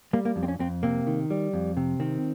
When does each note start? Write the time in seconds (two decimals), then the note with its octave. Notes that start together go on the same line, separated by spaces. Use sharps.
0.13 G3 A#3
0.25 A#3
0.36 F2
0.43 C4
0.48 C#4
0.59 F2 C4
0.83 C3 A#3
1.07 D#3
1.30 G3
1.53 F2
1.77 C3
2.00 D#3 C4